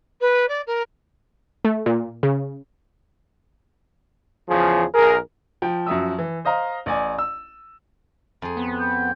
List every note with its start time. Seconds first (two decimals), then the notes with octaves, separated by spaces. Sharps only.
0.21 B4
0.49 D5
0.67 A#4
1.65 A3
1.86 A#2
2.23 C#3
4.49 E2 C#3 F3 G#4
4.94 B1 G#4 A#4
5.62 F3 G5
5.86 F#2 F3 F#3 E5 D#6 E6
6.19 E3
6.45 C5 D#5 F5 A#5
6.86 A1 D5 G#5
7.18 E6
8.42 F2 G#4
8.57 B3
8.80 G5